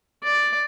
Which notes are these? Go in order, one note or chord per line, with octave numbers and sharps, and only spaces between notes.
D5